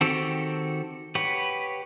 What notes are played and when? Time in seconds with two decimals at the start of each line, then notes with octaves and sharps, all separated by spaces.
0.01 D#3 C4 F#4 G4 A4
1.15 G4 B4 C#5 F#5